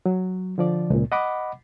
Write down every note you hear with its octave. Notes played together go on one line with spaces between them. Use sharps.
F#3
D3 F3 D5
C#2 A#2
D#5 F#5 B5 D6